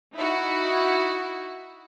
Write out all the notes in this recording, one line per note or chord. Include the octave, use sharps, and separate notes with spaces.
D#4 E4 F#4